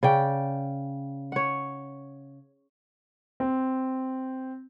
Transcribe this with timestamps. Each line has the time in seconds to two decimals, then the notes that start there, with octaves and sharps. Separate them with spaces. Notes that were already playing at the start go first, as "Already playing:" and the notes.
0.03 C#3 D5 G5
1.32 C#5 F#5
3.40 C4